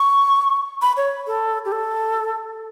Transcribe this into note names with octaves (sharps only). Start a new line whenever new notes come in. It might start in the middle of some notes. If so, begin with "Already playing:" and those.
Already playing: C#6
B5
C#5
A4
G4
A4